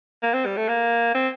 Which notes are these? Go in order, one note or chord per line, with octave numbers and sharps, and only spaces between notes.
A#3
C4
G3
A3
A#3
C4